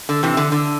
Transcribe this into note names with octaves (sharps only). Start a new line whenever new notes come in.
D3
C3 E3
D3
D3